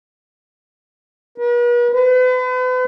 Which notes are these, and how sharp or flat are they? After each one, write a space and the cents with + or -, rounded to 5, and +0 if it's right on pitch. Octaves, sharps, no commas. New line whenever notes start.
B4 -45
B4 +40